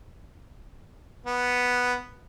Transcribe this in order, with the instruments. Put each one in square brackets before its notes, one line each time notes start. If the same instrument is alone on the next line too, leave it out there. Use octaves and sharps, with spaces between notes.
[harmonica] B3